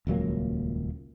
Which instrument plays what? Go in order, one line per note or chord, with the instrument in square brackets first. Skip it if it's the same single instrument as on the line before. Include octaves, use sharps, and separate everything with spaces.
[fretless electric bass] D#1 C#2 F#3 A#3